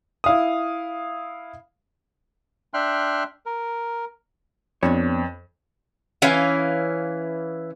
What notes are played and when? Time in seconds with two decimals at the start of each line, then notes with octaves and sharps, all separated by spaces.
0.24 E4 F5 D#6
2.74 D4 E5 G5 C6 F6 F#6
3.46 A#4
4.83 F2 B3 D4 C#5
6.22 E3 C#4 F5